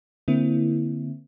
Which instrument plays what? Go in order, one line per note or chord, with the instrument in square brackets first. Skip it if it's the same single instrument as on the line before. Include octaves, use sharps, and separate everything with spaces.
[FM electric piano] D3 A#3 C4 E4